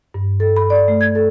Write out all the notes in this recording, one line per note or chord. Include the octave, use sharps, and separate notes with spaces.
G2
A4
B5
D5
A3
G#6
A4